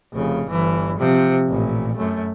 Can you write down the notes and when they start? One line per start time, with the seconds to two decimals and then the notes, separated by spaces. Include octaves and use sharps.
0.13 F1 C#3
0.48 G1 E3
0.99 C3 F3
1.48 A1 A#2
1.97 F#2 A3